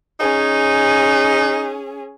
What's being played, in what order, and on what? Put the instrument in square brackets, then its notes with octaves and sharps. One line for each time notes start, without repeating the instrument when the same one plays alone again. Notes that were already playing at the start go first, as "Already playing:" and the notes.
[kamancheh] C#4 G#4 [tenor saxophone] D#4